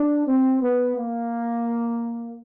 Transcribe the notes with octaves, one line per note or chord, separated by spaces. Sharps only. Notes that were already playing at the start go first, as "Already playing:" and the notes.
Already playing: D4
C4
B3
A#3